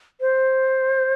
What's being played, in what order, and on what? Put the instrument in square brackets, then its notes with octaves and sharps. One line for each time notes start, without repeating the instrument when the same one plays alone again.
[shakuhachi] C5